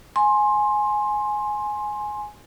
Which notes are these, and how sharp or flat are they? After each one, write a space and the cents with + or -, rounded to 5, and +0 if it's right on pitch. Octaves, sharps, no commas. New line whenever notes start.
G#5 +10 C6 +20